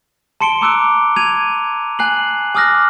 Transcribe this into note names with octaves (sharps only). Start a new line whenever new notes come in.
A5 C6 C#7 D7 G7
A#5 D6 E6 F#6 D7
G#6 D#7 F7
G#5 F#6 C7 F#7
G#5 D6 D#6 F6 F#6 A#6